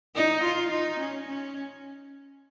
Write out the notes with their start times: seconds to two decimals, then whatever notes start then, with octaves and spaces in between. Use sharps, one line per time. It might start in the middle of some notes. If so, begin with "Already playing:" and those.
0.15 D#4
0.43 F4
0.71 D#4
0.99 C#4
1.27 C#4